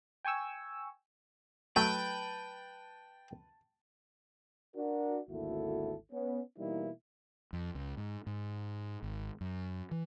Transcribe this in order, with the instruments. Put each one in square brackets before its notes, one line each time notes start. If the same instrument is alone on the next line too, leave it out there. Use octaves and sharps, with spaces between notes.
[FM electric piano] G5 G#5 C#6 E6
[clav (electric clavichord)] F#3 A3 [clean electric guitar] B4 [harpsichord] G5 [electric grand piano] A5
[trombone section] D4 F#4 A#4
G#1 D2 A#3 E4 F#4 A4
B3 C#4
B2 E3 G3 A#3 D#4 E4
[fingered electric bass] F2
C#2
G#2
G#2
G#1
F#2
E3